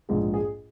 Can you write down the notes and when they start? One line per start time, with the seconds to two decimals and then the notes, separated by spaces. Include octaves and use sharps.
0.09 A#1 G#2 F3 G#4
0.34 G#4